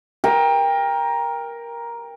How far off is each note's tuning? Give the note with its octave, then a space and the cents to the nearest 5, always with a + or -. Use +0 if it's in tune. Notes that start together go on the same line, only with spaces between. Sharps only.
A#4 +10 G5 +25